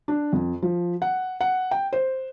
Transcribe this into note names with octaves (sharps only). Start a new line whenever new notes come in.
D4
F2
F3
F#5
F#5
G5
C5